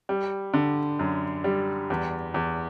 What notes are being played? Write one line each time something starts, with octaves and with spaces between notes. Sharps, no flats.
G3
D3
F#2
G3
E2
E2